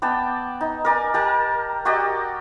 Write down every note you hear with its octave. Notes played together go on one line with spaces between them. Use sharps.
B3 D5 G5 A5
D#4
A#4 D5 G#5
G4 A#4 A5
F#4 G4 D5 D#5